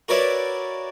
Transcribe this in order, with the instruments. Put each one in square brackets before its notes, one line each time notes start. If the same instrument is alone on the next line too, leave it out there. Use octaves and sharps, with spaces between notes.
[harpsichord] F#4 A#4 B4 C#5 D5 E5